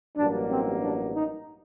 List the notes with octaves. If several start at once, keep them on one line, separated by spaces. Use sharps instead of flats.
A1 G2 F#3 A#3 D4
C4
D4
D#4